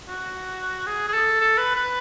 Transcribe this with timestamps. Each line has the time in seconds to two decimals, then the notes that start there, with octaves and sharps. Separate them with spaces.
0.08 F#4
0.87 G#4
1.08 G#4
1.13 A4
1.40 A4
1.58 B4
1.76 B4